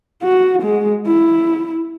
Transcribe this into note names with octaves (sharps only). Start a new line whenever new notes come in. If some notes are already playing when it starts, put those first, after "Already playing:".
F#4
G#3
E4